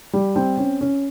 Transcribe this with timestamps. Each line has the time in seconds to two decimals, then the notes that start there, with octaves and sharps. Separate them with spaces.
0.13 G3
0.36 C4
0.58 C#4
0.81 C#4